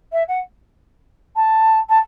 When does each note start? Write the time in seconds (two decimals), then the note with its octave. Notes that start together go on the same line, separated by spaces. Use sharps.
0.12 E5
0.28 F#5
1.36 A5
1.89 A5